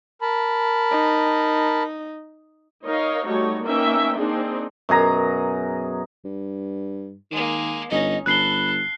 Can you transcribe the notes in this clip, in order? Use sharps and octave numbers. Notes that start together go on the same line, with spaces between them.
A#4 A5 B5
D#4
D#4 A#4 C#5 D#5 F5
G3 A3 D#4 F#4 C#5
A#3 B3 C#4 D#4 E5 G5
A#3 C4 D4 D#4 G#4
F#2 B2 G#4 A#5
G2
D#3 G#3 A#3
G1 C#4 D#4 D#5
G1 A4 B5 F#6 C7 G7